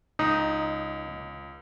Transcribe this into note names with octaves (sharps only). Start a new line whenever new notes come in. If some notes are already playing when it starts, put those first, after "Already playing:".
C#2 D#4